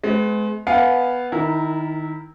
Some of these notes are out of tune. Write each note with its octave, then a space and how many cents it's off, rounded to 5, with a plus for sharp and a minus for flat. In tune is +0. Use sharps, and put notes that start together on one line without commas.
G#3 +35 B3 +40
B3 +0 F5 +0 G#5 +0
D#3 +0 E4 -20 A#4 -15